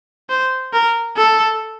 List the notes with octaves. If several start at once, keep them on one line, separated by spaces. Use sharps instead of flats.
C5
A#4
A4